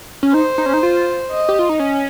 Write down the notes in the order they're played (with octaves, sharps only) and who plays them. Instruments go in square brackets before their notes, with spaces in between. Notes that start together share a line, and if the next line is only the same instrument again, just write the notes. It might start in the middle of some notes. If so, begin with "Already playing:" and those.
[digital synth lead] C#4
[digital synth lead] D#4 [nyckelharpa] C5
[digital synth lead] D#4
C#4
D#4
F4
[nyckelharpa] D#5
[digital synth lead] G4
F4
D#4
C#4